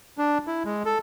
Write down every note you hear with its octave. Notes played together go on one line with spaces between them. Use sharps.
D4
E4
G#3
A4